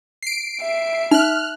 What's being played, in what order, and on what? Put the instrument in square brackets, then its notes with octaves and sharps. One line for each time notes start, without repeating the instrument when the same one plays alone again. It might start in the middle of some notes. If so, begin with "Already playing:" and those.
[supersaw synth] C7 D7
[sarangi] E5
[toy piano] D#4 [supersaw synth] F6 F#6